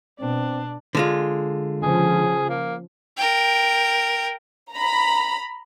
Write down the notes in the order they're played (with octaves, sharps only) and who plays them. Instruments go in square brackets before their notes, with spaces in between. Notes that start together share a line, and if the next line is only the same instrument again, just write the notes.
[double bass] B2 [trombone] C4 [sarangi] D4
[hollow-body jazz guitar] D3 G#3 F4
[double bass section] C#3 F3 [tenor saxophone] G#4
[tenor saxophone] A#3
[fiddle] A#4 G5
[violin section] A#5 B5